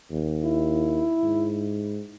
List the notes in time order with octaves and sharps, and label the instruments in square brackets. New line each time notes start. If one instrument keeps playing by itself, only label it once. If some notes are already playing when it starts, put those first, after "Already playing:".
[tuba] D#2
[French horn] E4
[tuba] G#2